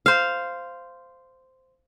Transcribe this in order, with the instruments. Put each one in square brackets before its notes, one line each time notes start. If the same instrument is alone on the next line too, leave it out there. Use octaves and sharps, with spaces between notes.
[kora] C5 F5